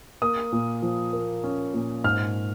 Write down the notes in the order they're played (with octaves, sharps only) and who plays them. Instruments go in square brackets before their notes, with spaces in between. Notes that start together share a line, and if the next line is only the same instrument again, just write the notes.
[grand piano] A#3 D#6
A#2
F3
A#3
C#4
A#2
G#2 F6